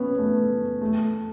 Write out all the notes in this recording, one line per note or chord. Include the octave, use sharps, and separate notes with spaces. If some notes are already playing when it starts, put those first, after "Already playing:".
Already playing: B3 C#4
A3
A3